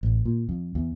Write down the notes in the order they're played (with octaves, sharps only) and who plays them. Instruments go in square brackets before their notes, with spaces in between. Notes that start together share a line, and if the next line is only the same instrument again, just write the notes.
[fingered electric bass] A1
A#2
F2
E2